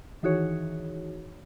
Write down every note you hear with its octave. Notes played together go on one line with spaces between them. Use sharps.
D#3 E3 D#4 F#4 G#4 C#5